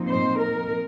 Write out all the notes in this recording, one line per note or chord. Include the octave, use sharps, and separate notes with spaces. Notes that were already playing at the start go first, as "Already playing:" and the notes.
Already playing: A#2 F3 C4 D#4
C5
A#4